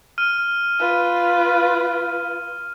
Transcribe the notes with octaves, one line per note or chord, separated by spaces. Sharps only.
F6 D#7
F4 B4